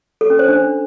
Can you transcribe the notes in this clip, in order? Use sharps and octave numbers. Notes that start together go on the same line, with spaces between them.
A4
C#4
C5
D4